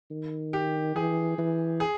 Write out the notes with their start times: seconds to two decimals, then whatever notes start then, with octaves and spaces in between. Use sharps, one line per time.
0.11 D#3
0.53 G4
0.95 E3 G#4
1.38 E3
1.80 G#4